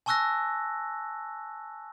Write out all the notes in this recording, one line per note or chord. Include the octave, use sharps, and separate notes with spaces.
G#5 A5 C#6 E6 F#6 A#6